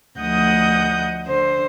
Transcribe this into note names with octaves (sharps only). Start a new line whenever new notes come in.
D2 F3 D#5 F#5 D#6 G6
D3 C5